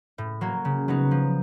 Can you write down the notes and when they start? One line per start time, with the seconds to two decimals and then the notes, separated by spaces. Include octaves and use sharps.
0.18 A2
0.41 F#3 A#3
0.65 C#3
0.88 F#3 B3 D#4
1.11 F3